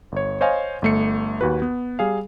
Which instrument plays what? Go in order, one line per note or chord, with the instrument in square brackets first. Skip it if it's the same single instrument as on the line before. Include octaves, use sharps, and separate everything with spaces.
[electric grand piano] G1 C#5
C5 C#5 D#5 F5 G#5
G1 A3 C#7
D#2 F#4 B4
B3
G3 G#4 F5